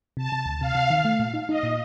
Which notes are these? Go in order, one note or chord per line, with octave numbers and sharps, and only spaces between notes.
C3 A5
C3
D2
C3 F5
C3
D#3
A3
A#2
D#4
D#4 D#5
A#2